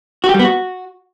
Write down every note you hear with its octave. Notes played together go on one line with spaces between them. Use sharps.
F#4
G4
G3
B3
F#4